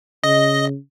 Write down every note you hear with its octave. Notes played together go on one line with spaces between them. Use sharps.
C#3 D#5